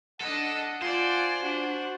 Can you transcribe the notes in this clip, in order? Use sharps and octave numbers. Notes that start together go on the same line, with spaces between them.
D4 A4 D#5 F#5
F4 C5 D5 G#5
D4 F#4